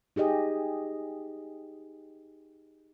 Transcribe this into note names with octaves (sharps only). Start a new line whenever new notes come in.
D#4 G4 G#4 D#5